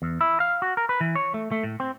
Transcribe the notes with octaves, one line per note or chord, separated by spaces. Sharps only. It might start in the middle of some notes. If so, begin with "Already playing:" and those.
E2
E4
F5
F#4
A#4
B4
E3
C#5
A3
A3
A2
C4